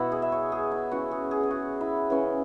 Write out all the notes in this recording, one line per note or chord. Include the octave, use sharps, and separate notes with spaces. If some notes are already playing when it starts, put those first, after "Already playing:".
Already playing: B2 B3 E4 F#4
G#4
E5
C#5
G#4
E4
C#3 E3 C#4 F#4
G#4
G#4
G#4
F#4
E4
C#3 E3 C#4